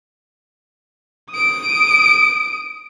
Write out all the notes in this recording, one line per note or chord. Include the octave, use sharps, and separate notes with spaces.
D#6 D7